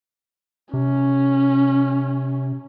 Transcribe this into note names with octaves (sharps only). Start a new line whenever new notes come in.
C3 C#4